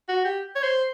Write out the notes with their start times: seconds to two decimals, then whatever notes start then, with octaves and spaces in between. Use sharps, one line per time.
0.08 F#4
0.25 G4
0.55 C#5
0.63 C5